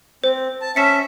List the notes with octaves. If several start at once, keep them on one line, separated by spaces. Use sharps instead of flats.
C4 C5
A5
C#4 E5 A5 B6 C#7